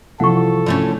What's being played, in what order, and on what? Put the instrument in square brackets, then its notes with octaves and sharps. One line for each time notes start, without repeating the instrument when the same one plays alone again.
[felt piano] C2 E3 F3 [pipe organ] A4 [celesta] F#5 C#6
[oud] D3 A3 C#4